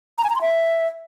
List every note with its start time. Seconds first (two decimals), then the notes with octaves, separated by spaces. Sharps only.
0.18 A#5
0.24 G#5
0.30 A#5
0.36 C6
0.41 E5